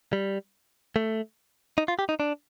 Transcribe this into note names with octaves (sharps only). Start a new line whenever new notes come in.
G3
A3
D#4
F4
G4
D#4
D4